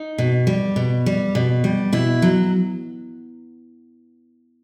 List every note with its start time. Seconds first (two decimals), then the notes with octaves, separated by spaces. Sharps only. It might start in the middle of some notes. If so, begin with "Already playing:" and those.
Already playing: D#4
0.18 B2
0.47 G3
0.76 B2
1.06 G3
1.35 B2
1.64 G3
1.93 B2 E4
2.22 F#3